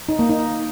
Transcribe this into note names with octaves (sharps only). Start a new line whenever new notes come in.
D#4
A#3
D#4